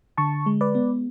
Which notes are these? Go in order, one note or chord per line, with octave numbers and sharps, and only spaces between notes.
D3 A5 C#6
G#3
B4 D5
B3